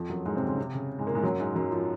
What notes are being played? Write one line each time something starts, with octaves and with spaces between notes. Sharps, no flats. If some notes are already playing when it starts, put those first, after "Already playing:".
Already playing: F2 F3
F#2 F#3
G#2 G#3
C3 C4
C#3
C3
C#3
G#2 G#3
A#2 A#3
G#2 G#3
F#2 F#3
G#2 G#3
F#2 F#3
F3